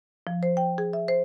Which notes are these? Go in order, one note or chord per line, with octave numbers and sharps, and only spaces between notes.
F3
C5
G5
G#4
E5
C5